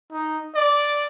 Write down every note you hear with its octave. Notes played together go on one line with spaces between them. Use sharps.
D#4
D5